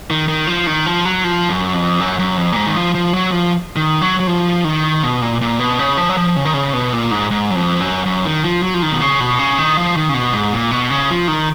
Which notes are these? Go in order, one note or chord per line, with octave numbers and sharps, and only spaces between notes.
D#3
D#3
F3
D#3
F3
F#3
F3
F#2
F2
F#2
F#2
F2
A#2
G#2
D#3
F3
F3
F#3
F3
D#3
F#3
F#3
F3
D#3
B2
A#2
A#2
B2
C#3
F3
F#3
F3
C#3
D#3
C#3
B2
A#2
G#2
G#2
F#2
F2
F#2
F#2
D#3
F3
F#3
F3
D#3
B2
C#3
B2
C#3
D#3
F3
D#3
C#3
B2
G#2
A#2
B2
C#3
F3
D#3